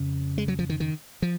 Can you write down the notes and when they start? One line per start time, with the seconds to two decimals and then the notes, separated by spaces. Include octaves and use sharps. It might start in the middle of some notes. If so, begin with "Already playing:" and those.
Already playing: F2 C#3
0.38 G#3
0.48 F#3
0.59 F3
0.70 D#3
0.80 D#3
1.22 F3